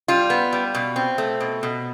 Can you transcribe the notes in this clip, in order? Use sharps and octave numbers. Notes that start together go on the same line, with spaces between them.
G3 F4
B3
G3
B2
C4
A3
B2
B2